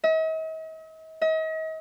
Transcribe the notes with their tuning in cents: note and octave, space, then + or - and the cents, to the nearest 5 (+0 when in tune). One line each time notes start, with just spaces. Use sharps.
D#5 +45
D#5 +40